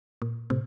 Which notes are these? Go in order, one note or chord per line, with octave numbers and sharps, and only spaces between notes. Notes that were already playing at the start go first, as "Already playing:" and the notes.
A#2
A2 C3